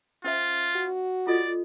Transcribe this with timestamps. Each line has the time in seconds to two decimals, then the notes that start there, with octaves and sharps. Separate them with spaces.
0.24 C#4 F4 C5 E5
0.75 F#4
1.27 F4 A4 D5 D#5